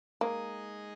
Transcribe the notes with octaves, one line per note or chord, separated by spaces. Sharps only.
G#3 A#3 D#4 G#4 D#5